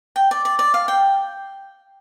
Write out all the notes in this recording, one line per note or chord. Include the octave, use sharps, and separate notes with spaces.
G5
D5
D5
D5
F5
G5